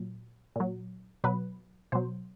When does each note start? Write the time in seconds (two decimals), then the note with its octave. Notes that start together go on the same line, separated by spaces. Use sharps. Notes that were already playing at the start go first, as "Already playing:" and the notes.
Already playing: A#2 F#3
0.56 A#2 F#3
1.24 B2 F#3 B4
1.92 B2 F#3 C5